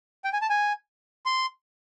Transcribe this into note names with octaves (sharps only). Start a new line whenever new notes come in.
G5
G#5
A5
G#5
C6